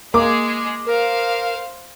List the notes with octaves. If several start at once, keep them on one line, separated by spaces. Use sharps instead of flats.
G#3 A#3 G#4 D6
A#4 C5 F5